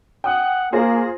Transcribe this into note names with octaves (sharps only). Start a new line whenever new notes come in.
F#5 G5 D#6
A#3 F4 G#4 C5 A#6